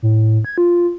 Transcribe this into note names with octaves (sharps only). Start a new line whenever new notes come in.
A2
G#6
F4